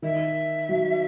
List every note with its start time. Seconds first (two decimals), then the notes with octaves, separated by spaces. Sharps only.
0.02 D#3 E5
0.69 F#3